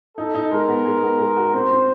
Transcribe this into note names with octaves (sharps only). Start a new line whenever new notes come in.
D#4 A4
D#4
G#3 A#4
B3
G#3
B3
G#3
F#4
C4 C5
C4